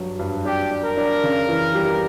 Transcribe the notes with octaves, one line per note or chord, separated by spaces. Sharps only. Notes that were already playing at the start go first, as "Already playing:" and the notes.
Already playing: G2 F#3
G2
D4 G4
D4
A#4
D4
C#3
E3
G3